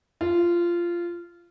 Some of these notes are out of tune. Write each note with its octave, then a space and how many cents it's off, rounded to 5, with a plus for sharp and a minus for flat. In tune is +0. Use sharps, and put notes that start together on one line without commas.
F4 -15